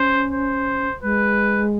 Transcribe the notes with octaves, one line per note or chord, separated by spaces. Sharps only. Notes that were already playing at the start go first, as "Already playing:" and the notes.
Already playing: C#4 C5
C5
G#3 B4